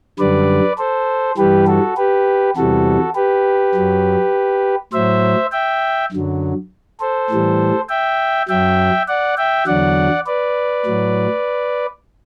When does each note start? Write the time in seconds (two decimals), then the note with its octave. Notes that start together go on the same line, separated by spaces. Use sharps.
0.19 F#2 D3 G3 B4 D5
0.78 A4 C5
1.37 G2 E3 G3 G4 B4
1.67 F#4 A4
1.97 G4 B4
2.56 E2 C3 E3 G3 F#4 A4
3.15 G4 B4
3.75 F#2 F#3
4.93 A2 F#3 C5 E5
5.52 E5 G5
6.12 F#2 D3 F#3
7.00 A4 C5
7.30 A2 E3 G3
7.89 E5 G5
8.48 F#2 F#3 E5 G5
9.08 D5 F#5
9.37 E5 G5
9.66 E2 D3 F#3 D5 F#5
10.26 B4 D5
10.86 A2 F#3